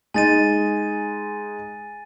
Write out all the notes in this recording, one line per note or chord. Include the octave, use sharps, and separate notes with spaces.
G#3 D#4 G#5 A6 D#7